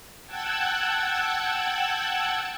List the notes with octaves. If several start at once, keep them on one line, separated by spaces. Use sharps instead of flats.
F#5 G5 A5 E6 F#6 G#6